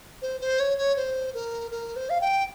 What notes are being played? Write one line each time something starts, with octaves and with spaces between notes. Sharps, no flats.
C5
C5
C#5
C#5
C5
A#4
A#4
C5
F5
G5